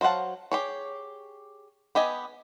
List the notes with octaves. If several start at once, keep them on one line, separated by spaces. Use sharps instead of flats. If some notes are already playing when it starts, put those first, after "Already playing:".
F#3 C5 F5 F#5 A5
G4 G#4 C#5
B3 G4 D#5 G#5